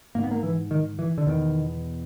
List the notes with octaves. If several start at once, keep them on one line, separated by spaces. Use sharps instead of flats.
G#2 A#3
B3
A#3
E3
D#3
E3
D3
E2 B2 D#3